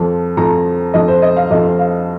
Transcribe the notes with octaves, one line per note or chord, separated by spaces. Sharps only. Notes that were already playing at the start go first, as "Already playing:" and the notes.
Already playing: F2 F3
F2 F3 A#5
F2 F3 D#5
C5
D#5
F5
F2 F3 D#5
F5